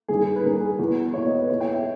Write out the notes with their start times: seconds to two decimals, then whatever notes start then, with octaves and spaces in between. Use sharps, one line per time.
0.08 G2 D#3 G#4
0.36 B4
0.44 G2 D#3 A#4
0.56 G#4
0.79 E2 B2 B4
1.14 E2 B2 C#5
1.26 D#5
1.38 B4
1.49 E2 B2 C#5
1.60 G5
1.72 E5